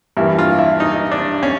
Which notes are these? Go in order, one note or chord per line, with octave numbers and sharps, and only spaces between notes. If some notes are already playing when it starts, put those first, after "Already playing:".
G2 E3 G3 A#3 E4
F4
E4
D#4
D4
C#4